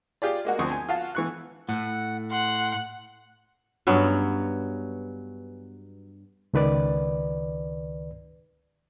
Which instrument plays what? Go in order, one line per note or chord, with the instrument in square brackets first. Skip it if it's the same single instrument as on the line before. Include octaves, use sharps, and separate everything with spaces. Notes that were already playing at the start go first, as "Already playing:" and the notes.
[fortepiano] F4 G4 G#4 D5
G#3 A#3 F#4
D2 F3 C4 C#6 D#6
G#5
F4 F#4 F5 A5
E3 C#6 F#6
[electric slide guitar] A2 [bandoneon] F#5
[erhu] F#5 [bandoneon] C6
[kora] G2 F#3 B3 C#4
[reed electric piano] C#2 D#3 B4 D5